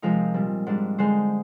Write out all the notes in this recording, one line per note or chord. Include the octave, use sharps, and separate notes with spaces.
C3 F3 G#3 D#4 A#4
A#2 G3 C4
G#2 G3 D4
D3 G#3 D#4 G#4 C5